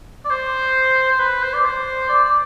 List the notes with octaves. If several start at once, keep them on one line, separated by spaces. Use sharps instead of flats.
D5
C5
C5
B4
C5
D5
C5
D5
D5